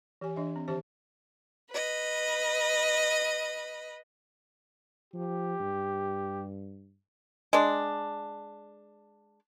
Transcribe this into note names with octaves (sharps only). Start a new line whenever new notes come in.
E3 G4 C#5 G#5
E3 D4 D#5 E5
C4
D#3 E3 G4 C5 E5 A5
B4 D#5
F3 G4
G2
G#3 D4